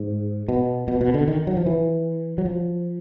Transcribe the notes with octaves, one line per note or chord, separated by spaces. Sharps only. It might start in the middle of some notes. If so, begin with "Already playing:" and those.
Already playing: G#2
B2
B2
B2
D3
D#3
F#3
F3
E3
F#3
F3